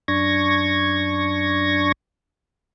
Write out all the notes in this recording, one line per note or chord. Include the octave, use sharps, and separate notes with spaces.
F#2 D4 C#6 G#6 A#6